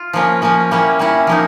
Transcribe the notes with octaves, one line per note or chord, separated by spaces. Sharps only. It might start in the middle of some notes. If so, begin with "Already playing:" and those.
Already playing: F4
F3 A#3 C#4
F3 A#3 C#4
G3 A#3 C#4 E4
G3 A#3 C#4 E4
F3 A#3 D#4